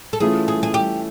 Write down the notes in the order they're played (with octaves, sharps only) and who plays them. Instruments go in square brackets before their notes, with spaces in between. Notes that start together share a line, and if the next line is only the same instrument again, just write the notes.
[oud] A4
[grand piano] E3 A3 C#4 F4 [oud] G#4
[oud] G#4
G#4
G4